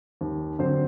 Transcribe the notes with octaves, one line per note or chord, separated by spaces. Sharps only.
D#2
D3 F#3 C4 C5